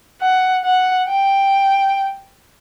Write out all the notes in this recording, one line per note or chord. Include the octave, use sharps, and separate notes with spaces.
F#5
F#5
G5